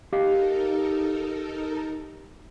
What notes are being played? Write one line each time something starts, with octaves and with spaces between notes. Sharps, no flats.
D#4 G4 A4 A#4 D#5 F5